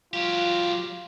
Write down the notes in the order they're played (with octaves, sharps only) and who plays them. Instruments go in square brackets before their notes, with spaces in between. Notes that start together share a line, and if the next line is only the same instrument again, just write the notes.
[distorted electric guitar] F#3 G4 [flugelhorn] F4